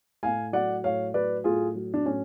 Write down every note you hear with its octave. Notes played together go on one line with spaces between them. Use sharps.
A2 F5 G#5
F#3 D5 F#5
A2 C#5 F5
F#3 B4 D5
A2 F4 G#4
F#3
D4
A2 C#4